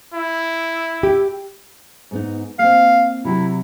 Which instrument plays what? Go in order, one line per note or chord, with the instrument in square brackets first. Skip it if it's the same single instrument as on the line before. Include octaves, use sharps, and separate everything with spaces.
[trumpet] E4
[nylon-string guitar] G4
G#2 B3 D#4
[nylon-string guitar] A#3 C4 [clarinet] F5
[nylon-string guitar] C3 F#3 F#4 [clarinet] E4